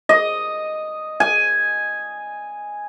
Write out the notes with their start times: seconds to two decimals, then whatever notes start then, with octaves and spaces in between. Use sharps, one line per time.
0.09 D#5
1.20 G#5